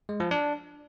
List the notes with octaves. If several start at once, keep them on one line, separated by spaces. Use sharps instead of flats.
G#3
F3
D4